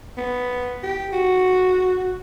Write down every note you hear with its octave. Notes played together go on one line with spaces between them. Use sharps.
B3
G4
F#4